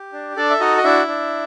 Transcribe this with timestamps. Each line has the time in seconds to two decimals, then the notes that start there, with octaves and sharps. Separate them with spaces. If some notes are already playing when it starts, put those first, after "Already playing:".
Already playing: G4
0.13 D4
0.36 D4 A4 D5
0.50 E5
0.60 D#4 F#4 D#5
0.77 D#5
0.84 D4 E4 E5
1.08 D4